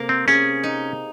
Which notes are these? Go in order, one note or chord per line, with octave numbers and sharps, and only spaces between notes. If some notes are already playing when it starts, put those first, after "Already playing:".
Already playing: C3 A#3
C4
C#4 G#4
D#4